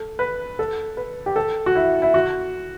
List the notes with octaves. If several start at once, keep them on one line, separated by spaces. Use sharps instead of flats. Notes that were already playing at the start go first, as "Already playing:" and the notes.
Already playing: A4
B4
A4
B4
G4
A4
F#4
E4
E4
F#4